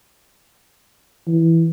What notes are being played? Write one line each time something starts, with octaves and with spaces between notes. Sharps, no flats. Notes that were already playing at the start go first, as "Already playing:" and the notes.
E3